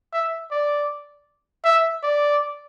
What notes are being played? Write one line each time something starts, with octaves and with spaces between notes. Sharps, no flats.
E5
D5
E5
D5